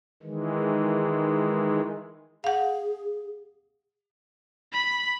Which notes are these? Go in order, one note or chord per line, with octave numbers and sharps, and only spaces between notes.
D#3 E3 G#3
G#4 F5 F#5
B5